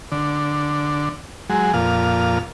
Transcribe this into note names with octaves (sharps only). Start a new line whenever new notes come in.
D3
F#3 G#3
F2 A#2 F5